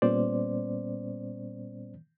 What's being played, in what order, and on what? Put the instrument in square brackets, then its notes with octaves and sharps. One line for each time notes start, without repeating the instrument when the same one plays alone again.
[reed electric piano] A#2 G3 B3 C#4 C5 D5